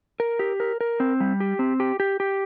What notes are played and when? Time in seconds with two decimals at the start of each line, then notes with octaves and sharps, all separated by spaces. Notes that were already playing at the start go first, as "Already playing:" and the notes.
0.20 A#4
0.39 G4
0.60 A#4
0.81 A#4
1.00 C4
1.20 G3
1.40 G4
1.59 C4
1.80 G4
2.00 G4
2.20 G4